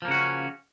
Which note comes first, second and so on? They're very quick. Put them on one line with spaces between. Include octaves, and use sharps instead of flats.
F3 A#3 C#3 F#4 C#4